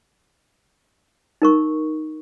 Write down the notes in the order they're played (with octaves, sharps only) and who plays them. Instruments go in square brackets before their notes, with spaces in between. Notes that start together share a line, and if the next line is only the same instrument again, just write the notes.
[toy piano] D#4 A#4 C#6